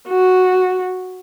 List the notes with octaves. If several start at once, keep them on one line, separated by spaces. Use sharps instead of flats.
F#4